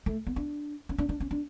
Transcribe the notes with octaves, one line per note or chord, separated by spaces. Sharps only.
A3
B3
D4
C#4
D4
D4
C#4
D4